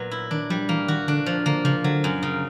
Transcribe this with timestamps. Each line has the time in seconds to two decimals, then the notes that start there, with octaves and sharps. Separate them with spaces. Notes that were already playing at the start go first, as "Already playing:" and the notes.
Already playing: A#2 F#3 B3
0.11 E4
0.31 D#3 D4
0.50 F3 G3
0.69 E3 A#3
0.88 D#3 F#4
1.08 D3 D4
1.26 F3
1.46 D3 A#3
1.64 C#3 F3
1.84 D3 F#3
2.04 F#2
2.23 C#3